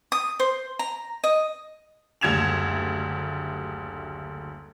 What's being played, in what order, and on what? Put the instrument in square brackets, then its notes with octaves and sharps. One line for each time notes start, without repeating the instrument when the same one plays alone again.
[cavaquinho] D#6
C5
A#5
D#5
[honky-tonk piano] F#1 D2 G3 G#6 E7 F7